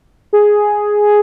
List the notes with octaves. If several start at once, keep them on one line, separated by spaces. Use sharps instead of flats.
G#4